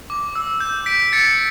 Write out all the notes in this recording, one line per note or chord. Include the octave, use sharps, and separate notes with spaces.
D6
E6
G6
B6 D7
A6 C#7